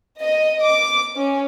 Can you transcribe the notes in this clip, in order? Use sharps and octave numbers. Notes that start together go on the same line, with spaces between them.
D#5
D6
C#4